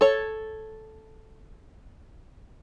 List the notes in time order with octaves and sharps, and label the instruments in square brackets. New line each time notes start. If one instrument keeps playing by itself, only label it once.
[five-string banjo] A4 C#5